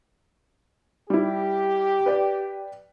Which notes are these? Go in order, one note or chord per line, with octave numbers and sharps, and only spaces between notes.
G3 E4 G4
B4 D5 G5